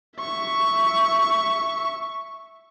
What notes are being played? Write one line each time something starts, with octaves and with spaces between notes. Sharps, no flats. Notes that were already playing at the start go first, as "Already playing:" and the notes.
E5 C#6